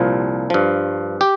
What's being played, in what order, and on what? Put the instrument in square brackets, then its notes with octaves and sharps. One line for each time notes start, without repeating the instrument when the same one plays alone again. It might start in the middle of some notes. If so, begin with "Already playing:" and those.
Already playing: [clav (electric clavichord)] C2 A#2 F3
G2 F3
G4